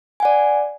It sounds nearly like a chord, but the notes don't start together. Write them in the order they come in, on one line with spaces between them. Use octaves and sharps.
G#5 F#5 D5